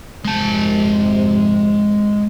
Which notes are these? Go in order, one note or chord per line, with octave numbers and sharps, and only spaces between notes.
G#1 F2 C3 G#3 A5